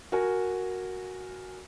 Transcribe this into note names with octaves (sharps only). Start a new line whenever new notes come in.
F#4 A#4 G#5